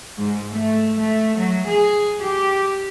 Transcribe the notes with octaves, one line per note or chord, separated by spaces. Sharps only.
G#2
A3
A3
F#3
G#4
G4